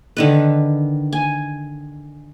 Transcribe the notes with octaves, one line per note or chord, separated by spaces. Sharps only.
D3 D#3 B4
G#5